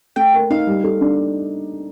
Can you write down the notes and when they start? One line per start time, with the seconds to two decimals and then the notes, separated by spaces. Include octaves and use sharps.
0.16 A3 G5
0.34 A#4
0.50 D#4 F5
0.67 G3
0.84 A4
1.01 D4